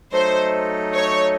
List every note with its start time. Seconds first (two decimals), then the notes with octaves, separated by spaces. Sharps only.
0.12 F#3 A3 D#4 A4 C5 D#5
0.94 C#5